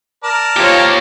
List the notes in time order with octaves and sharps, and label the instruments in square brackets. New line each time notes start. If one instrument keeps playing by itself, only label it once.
[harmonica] A#4 D5 A5
[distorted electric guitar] A#3 G4 [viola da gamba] F4 C5 C#5